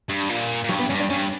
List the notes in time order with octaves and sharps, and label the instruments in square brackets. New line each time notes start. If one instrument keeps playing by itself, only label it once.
[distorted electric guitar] G2
A#2
A#2
[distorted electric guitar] G2 [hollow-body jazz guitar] F#3
[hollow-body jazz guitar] B3
[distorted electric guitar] G2 [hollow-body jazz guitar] C#4
[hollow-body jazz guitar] D4
[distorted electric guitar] G2 [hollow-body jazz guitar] C#4